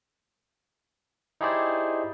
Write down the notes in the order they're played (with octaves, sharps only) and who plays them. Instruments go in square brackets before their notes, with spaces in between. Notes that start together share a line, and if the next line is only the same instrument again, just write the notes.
[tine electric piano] D#4 E4 G4 G#4 C5 D5